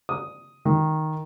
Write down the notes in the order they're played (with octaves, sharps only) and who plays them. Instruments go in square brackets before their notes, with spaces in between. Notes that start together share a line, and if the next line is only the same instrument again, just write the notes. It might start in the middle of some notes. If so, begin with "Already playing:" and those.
[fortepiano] D#6
D#3